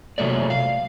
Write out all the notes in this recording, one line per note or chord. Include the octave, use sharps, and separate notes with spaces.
C3 F#3 A3 A4 D5
F5